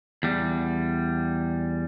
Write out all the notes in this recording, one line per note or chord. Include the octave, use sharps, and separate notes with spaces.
E2 G3